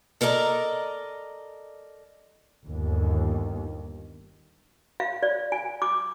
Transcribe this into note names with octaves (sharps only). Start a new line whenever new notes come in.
A4 A#4 D5 D#5 A#5
G1 D#2
F5
D5
G#5
D6